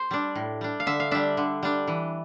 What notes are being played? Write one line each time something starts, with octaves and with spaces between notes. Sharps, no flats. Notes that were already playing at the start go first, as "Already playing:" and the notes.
Already playing: C5
G3 D4
A2
G3 D4
F5
D3 E5
F5
G3 D4 E5
D3
G3 D4
E3